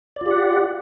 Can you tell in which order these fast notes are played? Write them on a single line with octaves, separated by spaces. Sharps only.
D5 F4 G4 F#5